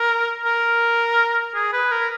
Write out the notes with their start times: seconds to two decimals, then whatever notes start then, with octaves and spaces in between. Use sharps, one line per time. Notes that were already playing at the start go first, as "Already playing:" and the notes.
Already playing: A#4
0.46 A#4
1.55 G#4
1.73 B4
1.92 A#4